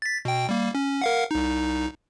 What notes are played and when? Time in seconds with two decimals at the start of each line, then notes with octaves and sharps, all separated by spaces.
0.02 A6 B6
0.25 B2 G5
0.49 G3 A#3
0.75 C#4
1.02 A#4 F5 F#5
1.31 C2 D#4